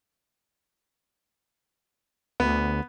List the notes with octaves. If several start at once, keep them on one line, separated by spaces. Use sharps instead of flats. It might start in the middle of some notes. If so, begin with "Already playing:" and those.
D2 B3